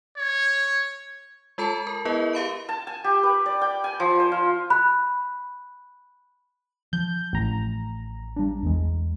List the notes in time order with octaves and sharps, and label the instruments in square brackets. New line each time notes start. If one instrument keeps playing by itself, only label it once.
[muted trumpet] C#5
[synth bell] G#3 F4 A4 A5 B5
A#4
B3 E4 G#4 A#4 B4 D#5
G4 F5 B5 D7
[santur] A5
G#5
G4
B4
D5
G5
G#5
F3
C5
F4
[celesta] B5 F#6
[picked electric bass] F3 [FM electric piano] G6
[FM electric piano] A1 A#5
[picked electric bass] G3 D4
E2 E3 G#3